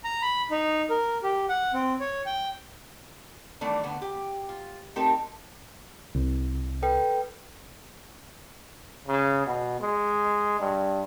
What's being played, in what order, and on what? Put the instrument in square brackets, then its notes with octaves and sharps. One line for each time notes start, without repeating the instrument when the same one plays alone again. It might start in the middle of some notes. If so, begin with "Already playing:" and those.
[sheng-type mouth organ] A#5
B5
D#4
A#4
G4
F#5
C4
C#5
G5
[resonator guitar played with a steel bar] D#3 E3 G3 A3 D4
A2 D3 B3
G4
F4
A3 C4 D#4 G4 A4 A#4
[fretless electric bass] C2
[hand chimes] A4 B4 G5
[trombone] C#3
B2
G#3
G2